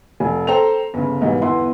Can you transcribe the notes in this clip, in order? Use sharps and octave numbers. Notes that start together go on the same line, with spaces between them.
F1 G#5
A4 C5 G5 A#5 F7
G1 C#3
B1 G#2 D#3 E3 G3
G1 E2 E4 B4 C6